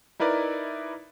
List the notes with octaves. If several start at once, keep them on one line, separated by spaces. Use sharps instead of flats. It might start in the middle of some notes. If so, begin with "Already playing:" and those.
D#4 E4 A#4 B4 D5